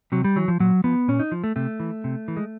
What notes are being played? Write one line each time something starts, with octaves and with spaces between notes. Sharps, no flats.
C3 F#3
G3
E3 F#3
F3
A#2 F#3
F3 B3
A#2 C#4
D#4
F3
A3
C3 A3
E3
C3
E3
G#3